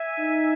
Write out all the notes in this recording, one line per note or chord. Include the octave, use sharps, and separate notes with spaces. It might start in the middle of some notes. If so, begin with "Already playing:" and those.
Already playing: E5 G#5
D#4